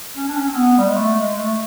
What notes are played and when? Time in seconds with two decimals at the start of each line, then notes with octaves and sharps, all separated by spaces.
0.16 C#4
0.28 D4
0.37 C#4
0.48 C4
0.56 B3
0.78 G3
0.88 G#3
0.96 A3
1.17 G#3
1.37 A3